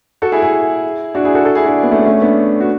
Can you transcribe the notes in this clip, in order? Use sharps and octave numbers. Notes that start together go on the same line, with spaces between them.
F#4 A4
E4 G#4
E4 G#4
D4 F#4
E4 G#4
F#4 A4
F#4 A4
E4 G#4
D4 F#4
B3
A3 C#4
A3 C#4
B3 D4
F#4